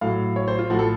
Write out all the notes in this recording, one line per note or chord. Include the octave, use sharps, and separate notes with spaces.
A2 F#3 F5
C#5
C5
F4
A2 F3 F#4
A4